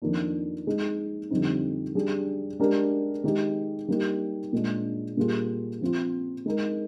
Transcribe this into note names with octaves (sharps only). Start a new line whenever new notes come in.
F2 D#3 A#3 D4
G#3 D#4 G#4
F2 D3 G3 C4 D#4
G3 D4 G#4
G#3 D4 G4 A#4
D#3 G#3 D#4 G4
G3 A#3 D#4 G4
A#2 G#3 D4
A#2 G3 A#3 F4 G#4
F3 C4 F4
G#3 D#4 A#4